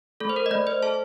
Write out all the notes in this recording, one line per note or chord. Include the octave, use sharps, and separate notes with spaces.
A3 A4
C5
A#4
D#5
A3 D5
C5
A4 A5